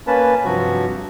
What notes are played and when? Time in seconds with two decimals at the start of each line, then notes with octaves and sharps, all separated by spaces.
0.07 A#3 C#4 B4 A5
0.44 G2 C3 F3 F#3 F#4